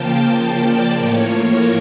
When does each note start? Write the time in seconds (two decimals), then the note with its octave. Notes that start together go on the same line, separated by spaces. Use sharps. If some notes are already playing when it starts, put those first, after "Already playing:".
Already playing: C#3 F3 A#3 G5 A5
0.13 G5
0.56 D5
0.98 A2 F3 A#3 C#5
1.41 A#4